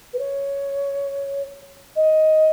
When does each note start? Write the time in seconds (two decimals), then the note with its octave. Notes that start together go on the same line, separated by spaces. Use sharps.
0.13 B4
0.19 C#5
1.96 D#5